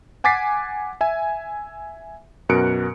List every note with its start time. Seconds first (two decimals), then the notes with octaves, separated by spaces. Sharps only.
0.24 F#5 G#5 D6 A6 B6 C7
1.01 E5 G#5
2.49 F#2 B2 A#4 F#6 C#7 D7